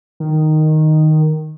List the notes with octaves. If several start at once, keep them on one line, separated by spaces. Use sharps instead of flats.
D#3